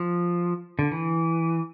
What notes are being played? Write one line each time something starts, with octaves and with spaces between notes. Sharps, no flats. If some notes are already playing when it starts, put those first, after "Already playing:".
Already playing: F3
D3
E3